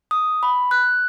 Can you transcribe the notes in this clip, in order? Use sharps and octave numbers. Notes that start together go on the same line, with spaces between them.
D#6
B5
F#6